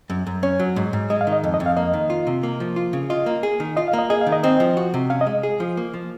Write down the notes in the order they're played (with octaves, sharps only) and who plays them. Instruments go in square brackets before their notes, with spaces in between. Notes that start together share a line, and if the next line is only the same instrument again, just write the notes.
[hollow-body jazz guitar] F#2
F#2
[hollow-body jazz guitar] C#4 [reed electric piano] C#5
[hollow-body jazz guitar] F#3
G#2
G#2
[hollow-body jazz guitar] G#3 [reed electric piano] D#5
[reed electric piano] F5
[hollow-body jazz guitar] D#3
[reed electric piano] D#5
[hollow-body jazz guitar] F2
[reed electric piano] D#5
[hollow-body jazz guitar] F2
[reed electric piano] F5
[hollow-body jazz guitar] A#3 [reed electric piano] D#5
[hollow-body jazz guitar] D#3
F4
C3
A#3
F3
F4
C#3
[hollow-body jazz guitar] F4 [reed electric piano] D#5
[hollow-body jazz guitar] A#3
G#4
D#3
[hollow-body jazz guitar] F4 [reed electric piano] D#5
[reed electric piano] F5
[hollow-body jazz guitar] A#3
[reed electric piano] D#5
[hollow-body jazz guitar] G#4 [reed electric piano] D#5
[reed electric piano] F5
[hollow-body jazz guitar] D#3
[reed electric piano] D#5
[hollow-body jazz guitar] C4 [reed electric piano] D#5
[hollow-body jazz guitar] F3
F#4
C3
[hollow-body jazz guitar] C#4 [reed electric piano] F5
[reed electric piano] D#5
[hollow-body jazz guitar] G#3
G#4
F3
A#3
F3